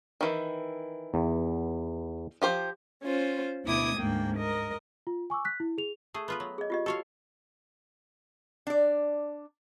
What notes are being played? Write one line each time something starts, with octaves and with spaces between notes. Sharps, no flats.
D#3 E3
E2
F3 G4 C5
C#4 F4 C5
D2 B2 E4 D6 D#6 G#6
D2 G#2 A#3 G5
A#4 D#5
F4
G#5 C#6 D6 E6
F#6 B6
E4
G#4 F7
A3 G#4
B3 F4 B4
F#3
G#4 D#5
F4 G4 D#5
F#4 G4 A4 C#5 F5
D4 D5